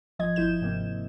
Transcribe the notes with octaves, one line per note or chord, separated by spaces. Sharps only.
G#1 F3 D#5 G#6
G1 F3 E4 G6 E7
G#2 C3 A#3 C4